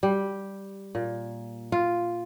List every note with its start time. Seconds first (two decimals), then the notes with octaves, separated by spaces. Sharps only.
0.03 G3
0.95 A#2
1.72 F4